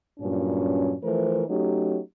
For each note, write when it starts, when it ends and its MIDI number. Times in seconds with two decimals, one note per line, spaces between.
0.20 0.95 43
0.20 0.95 46
0.20 0.95 54
0.20 0.95 61
1.03 1.43 52
1.03 1.43 53
1.03 1.43 57
1.03 1.43 70
1.03 1.43 72
1.48 1.99 54
1.48 1.99 57
1.48 1.99 61
1.48 1.99 63
1.48 1.99 67